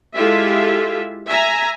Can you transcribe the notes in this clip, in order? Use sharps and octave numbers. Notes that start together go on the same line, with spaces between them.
G#3 E4 F4 G4 A4 E5
E5 G#5 A#5